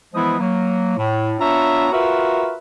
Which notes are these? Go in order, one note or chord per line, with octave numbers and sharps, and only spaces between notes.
E3 F3 G#3 B3 E4 D#6
F#3 A#3
A2
B3 D4 F4 C#5 E5 A#5
F4 F#4 A#4 B4 E5